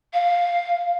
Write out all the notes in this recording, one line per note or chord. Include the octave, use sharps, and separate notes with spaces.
F5